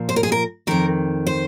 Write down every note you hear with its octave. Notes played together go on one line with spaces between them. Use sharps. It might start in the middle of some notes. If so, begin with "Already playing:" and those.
Already playing: A#2 F3
C5
A#4
G#4
A#4
F2 D#3 A#4
C5